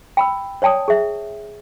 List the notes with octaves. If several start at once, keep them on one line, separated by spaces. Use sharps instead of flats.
G5 B5 E6
C#5 D5 G5 A5 D#6
G#4 E5